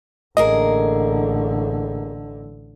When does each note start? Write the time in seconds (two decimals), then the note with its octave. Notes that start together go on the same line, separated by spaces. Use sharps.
0.37 A1 D3 A#3 G#4 A#4 D#5